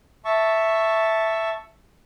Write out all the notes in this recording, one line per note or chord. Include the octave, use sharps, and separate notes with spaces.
E5 A5 C#6